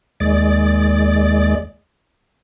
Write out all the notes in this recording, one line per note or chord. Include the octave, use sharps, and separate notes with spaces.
D#2 G#3 D5